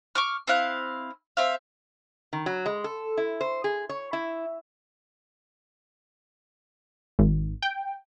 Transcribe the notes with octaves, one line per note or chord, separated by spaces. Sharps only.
C#6 D6 F6
C4 E4 F5 F#6
C4 E5 F5
D#3
F#3
G#3
A4
E4
C5
G#4
C#5
E4
G#1
G5